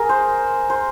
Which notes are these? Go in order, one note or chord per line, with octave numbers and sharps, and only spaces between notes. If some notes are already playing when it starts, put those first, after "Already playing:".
Already playing: G#4 A#4
C5
C5